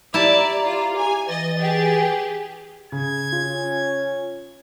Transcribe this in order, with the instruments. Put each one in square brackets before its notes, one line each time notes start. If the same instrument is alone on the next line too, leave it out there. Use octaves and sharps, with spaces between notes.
[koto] E4 E5 A5 [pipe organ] G4 A#5 [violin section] D5
[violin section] F4
G#5
[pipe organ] E3 A6 [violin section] D#5
[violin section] G4 G#4
[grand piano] C#3 [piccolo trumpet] G#6
[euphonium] C#4 [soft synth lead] F4